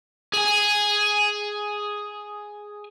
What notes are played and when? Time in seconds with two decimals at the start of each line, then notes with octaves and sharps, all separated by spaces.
0.33 G#4 G#5